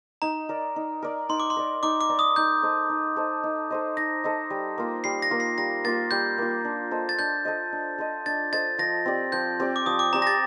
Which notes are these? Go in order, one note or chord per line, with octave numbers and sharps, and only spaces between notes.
D#4 A#5
A#4 D5
D#4
A#4 D5
D#4 C6
D6
C6
A#4 D5
D#4 D6
D6
A#4 D5
D#6
D#4 G6
A4 C5 D#5
D#4
A4 C5 D#5
D#4
A4 C5 D#5
D#4 A#6
A4 C5 D#5
G3
A#3 F4
G3 C7
A#6
A#3 F4
C7
G3 A#6
A#3 F4 A6
G3 G6
A#3 F4
D4
A4 C5 D#5
A6
D4 G6
A4 C5 D#5
D4
A4 C5 D#5
D4 A6
A4 C5 D#5 A6
F3 A#6
C4 G4 D5
F3 G6
C4 G4 D5
D6
F3 D#6
D6
C4 G4 D5 A#5
A#6
A6